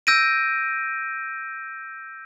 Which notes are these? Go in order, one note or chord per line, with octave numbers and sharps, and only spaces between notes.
E6 G6 A#6 D7 D#7